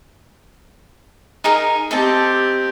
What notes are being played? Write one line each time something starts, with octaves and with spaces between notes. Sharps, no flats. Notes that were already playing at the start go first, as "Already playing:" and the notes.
D#4 G#4 A#4
C4 G4 A4 D#5 A5